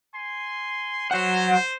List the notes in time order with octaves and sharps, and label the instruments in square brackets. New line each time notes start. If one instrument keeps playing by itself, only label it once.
[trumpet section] G#5 C6
[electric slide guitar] F#3 F#5 [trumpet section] C5